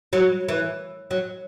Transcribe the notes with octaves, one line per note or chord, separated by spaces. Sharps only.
F#3
E3
F#3